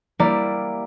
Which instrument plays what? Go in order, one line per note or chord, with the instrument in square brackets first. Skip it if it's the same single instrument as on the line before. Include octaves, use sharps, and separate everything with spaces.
[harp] G3 A#3 E4 D5